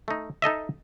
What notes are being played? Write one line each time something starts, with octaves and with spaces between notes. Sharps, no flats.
A3 D#4
D#4 A4 D#5 E5